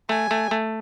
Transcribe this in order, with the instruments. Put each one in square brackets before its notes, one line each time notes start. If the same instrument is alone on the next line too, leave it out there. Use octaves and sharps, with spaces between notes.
[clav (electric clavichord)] A3 [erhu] G#5
[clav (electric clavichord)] A3
A3